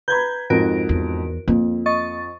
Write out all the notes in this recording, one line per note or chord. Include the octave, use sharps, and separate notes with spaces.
B4 A#5 B5 G6 G#6
F2 G#2 F#4 A#4 D7
E2
F2 A#3
D#5 C#6 A6